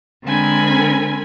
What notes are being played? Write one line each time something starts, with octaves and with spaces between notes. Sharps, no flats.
D3 G#3 C4 A#4 G#5 B5